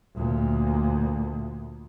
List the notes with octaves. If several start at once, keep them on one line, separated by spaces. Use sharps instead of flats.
D2 A#2